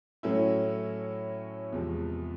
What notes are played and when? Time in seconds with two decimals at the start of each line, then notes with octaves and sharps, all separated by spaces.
0.23 A2 F#3 A3 C#4 E4
1.72 E2 C3 F3 G#3